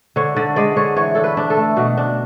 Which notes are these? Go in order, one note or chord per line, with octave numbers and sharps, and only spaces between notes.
D3 C#5
D3 D5
G#3 D5
D3 C#5
E3 C#5
D4 A4
B4
D4
A4
A3
B2 F#4
D4